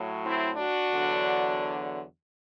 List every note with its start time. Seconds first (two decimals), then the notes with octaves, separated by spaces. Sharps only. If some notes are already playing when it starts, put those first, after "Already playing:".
Already playing: A2 F#3
0.24 C4 E4
0.57 D4 F#4
0.92 E2 D3 F#3